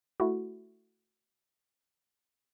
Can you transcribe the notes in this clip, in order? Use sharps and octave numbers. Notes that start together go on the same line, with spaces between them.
A3 E4 F#4